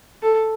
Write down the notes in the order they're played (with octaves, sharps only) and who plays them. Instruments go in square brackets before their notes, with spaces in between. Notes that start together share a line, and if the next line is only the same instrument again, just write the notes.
[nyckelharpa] A4